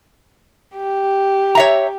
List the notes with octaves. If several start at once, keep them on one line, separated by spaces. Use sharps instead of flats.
G4
C#5 E5 A#5